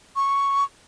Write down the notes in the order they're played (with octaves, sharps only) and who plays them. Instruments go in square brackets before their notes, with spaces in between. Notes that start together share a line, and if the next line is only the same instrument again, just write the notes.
[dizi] C#6